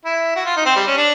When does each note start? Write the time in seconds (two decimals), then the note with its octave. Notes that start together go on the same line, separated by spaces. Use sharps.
0.05 E4
0.36 F#4
0.45 F4
0.57 D#4
0.66 C4
0.76 G3
0.87 C#4
0.97 D4